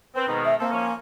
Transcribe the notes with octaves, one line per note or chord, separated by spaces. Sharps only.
C4 B4
G#2 B2 D#3
E5
A#3 C4 A4
F3 C#4